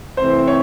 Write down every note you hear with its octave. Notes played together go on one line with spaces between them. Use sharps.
C3 E3 A3 C4 C5
C#5